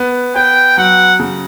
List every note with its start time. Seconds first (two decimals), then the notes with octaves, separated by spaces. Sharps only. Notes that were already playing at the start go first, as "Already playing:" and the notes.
Already playing: B3
0.36 B3 G5
0.77 F#3 F#5
1.20 C#3